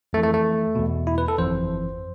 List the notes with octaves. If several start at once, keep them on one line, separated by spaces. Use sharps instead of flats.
F2 E3 A3
A3
A3
E2 B2
E4
B4
A4
G1 F2 E3 C5